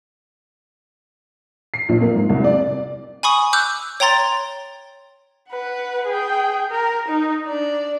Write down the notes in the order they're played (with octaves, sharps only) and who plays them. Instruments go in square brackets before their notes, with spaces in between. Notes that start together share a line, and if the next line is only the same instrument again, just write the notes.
[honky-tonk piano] C7
A#1
A#3
G#2
C2
D5
[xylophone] G#5 B5 C#6 D#6
D6 E6 F#6 G6
C#5 G5 A#5 C6 A6
[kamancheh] B4 F#5
G#4 G5
A#4
D#4
D4 D5